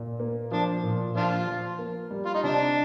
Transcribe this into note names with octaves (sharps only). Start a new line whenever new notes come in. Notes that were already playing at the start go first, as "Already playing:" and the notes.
Already playing: A#2
A#3
F3 D4
A#2
F3 D4 F4
F3
A#3
G3
F4
D#4
C3 D4